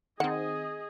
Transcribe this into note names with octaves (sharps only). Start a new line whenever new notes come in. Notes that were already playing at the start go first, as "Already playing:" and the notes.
D#3 C4 G#4 D#5 F#5